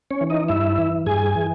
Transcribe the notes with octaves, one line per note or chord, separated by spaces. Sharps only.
C#4 C#5
E3
D#4 D#5
G2 E4 E5
E3
G2 G#4 G#5
E3